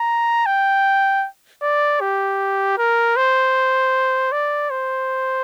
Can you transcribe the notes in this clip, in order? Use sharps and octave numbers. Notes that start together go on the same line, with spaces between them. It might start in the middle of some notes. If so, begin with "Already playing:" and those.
Already playing: A#5
G5
D5
G4
A#4
C5
D5
C5